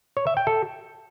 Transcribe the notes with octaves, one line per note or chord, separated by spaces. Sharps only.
C#5
E5
G5
A4